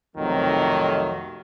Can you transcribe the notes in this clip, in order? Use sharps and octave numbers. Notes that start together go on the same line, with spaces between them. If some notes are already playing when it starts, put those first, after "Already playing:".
B1 F2 C3 D#3 F#3 A3